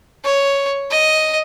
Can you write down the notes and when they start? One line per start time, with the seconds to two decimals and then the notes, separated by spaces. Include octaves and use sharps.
0.24 C#5
0.91 D#5